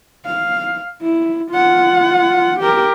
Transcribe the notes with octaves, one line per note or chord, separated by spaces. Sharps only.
F5
E4
F4 F#5
G4 A#4